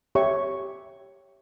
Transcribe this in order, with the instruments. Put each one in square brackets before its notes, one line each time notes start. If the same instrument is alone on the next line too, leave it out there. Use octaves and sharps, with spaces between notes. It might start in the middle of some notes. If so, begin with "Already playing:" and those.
[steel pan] G4 C#5 E5 C#6